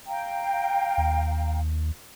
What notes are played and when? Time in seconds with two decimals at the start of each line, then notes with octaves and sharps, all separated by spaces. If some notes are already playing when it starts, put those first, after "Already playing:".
0.07 F5 G5 A#5
0.98 D#2